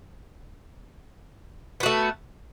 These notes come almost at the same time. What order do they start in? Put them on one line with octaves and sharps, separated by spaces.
B3 F#4 A3